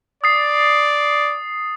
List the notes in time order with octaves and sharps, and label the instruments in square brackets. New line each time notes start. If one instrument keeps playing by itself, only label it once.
[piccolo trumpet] D5 [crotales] D#6 A6 C7